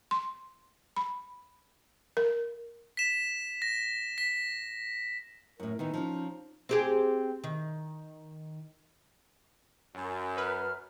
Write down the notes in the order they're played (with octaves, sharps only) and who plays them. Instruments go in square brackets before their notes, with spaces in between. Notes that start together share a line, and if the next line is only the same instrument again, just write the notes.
[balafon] C6
B5
A#4
[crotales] B6 E7
A#6
B6
[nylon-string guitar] F#2 A2 [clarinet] A#4
[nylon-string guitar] D#3 E3 B3 [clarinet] D#4
[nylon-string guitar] F3 C#4
[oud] C4 G4 G#4
D#3
[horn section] F#2
[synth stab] B4 [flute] F6